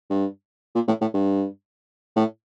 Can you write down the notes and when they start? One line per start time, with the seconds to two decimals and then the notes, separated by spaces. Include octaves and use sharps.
0.10 G2
0.75 A#2
0.88 A2
1.01 A2
1.14 G2
2.16 A2